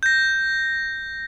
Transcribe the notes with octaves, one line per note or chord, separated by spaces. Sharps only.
G6 A#6